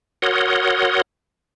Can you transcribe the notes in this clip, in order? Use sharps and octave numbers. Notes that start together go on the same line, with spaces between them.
F#4 A#4 C#5 F#5 C6 D#6